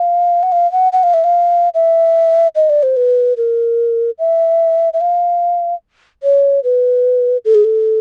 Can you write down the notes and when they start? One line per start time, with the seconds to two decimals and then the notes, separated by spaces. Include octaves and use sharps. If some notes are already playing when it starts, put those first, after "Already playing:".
Already playing: F5
0.43 F#5
0.52 F5
0.72 F#5
0.92 F#5
1.03 F5
1.14 E5
1.24 F5
1.74 E5
2.55 D#5
2.69 D5
2.83 C5
2.96 B4
3.37 A#4
4.19 E5
4.93 E5
5.01 F5
6.23 C#5
6.64 B4
7.45 A4
7.55 G#4
7.64 A4